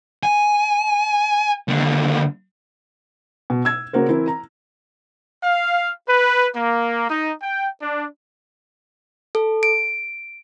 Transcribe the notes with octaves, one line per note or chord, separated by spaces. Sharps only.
G#5
D#2 D3
B2
E6 G#6
C#3 A#3 F#4 A#4 C5
E3 C4 E4 A#4
A#5
F5
B4
A#3
D#4
G5
D4
A4
D7